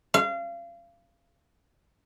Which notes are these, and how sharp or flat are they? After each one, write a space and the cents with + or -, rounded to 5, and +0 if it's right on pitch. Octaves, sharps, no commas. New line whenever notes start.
F5 -30